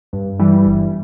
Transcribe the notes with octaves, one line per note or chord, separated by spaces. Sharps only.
G2
E3 G3
G1